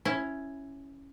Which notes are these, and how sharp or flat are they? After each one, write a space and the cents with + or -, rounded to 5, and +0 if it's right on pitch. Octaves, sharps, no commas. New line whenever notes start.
C#4 +0 E4 +0